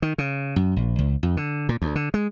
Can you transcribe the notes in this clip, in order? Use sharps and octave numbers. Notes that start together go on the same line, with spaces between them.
D#3
C#3
F#2
A#1
C#2
F2
D3
A#2
D2
D3
G#3